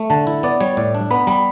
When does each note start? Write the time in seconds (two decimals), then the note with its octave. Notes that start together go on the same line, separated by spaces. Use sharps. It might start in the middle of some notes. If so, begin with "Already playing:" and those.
Already playing: A3
0.10 D3 A5
0.27 E4
0.43 B3 D5
0.60 G3 C#5
0.77 A2 D5
0.94 D4
1.11 B3 B5
1.27 G3 B5